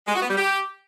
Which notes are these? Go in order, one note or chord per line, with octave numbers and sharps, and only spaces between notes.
G#3
F#4
B3
G3
G4